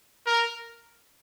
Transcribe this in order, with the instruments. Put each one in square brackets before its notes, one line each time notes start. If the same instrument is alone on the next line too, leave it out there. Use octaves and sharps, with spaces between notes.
[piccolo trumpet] A#4